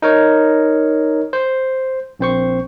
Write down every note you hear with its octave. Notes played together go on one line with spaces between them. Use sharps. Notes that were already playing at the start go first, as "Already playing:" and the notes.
D#4 A#4 C#5
C5
A#1 C4 C5 C#6